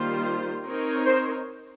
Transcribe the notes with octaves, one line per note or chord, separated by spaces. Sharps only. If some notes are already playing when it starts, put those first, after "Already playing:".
Already playing: D#3 G3 A#3 F4 C5
C4 D#4 A#4 C#5
C5